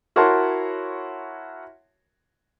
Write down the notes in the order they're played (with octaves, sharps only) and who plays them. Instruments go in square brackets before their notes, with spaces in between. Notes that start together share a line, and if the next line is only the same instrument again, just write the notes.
[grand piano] E4 F#4 A#4 C#5 A5 C6